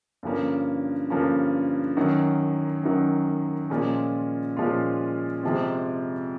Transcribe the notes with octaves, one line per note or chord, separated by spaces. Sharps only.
G2 D3 F3 A#3 C#4
G2 D3 F3 A#3 C#4
F#2 D#3 F#3
F#2 D#3 F#3
A#2 F3 G#3 C#4 F4
A#2 F3 G#3 C#4 F4
F2 C3 F3 G#3 C4